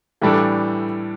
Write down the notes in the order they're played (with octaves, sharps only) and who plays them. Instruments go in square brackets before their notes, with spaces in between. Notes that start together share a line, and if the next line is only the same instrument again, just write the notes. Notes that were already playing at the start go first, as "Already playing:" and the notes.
[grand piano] A2 E3 G3 D4 A4